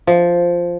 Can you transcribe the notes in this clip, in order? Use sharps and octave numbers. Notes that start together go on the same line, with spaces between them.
F3